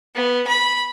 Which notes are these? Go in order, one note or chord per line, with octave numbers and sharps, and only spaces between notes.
B3
B5